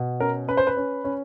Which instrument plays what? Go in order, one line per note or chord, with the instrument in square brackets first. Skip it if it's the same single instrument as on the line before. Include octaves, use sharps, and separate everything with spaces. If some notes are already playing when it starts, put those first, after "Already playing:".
Already playing: [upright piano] B2
C#4 A#4
C#4 B4
C5
B4
C#4
C#4